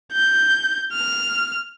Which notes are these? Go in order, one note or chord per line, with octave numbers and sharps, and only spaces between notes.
G6
F6